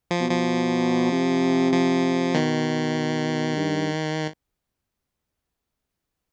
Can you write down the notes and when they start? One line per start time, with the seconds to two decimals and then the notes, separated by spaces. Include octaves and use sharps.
0.11 F3
0.21 B2
0.30 F3
1.12 C3
1.73 F3
2.34 B2 D#3
3.57 G2